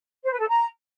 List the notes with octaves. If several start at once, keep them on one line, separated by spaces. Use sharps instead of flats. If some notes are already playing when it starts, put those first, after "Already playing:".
C5
B4
A4
A#5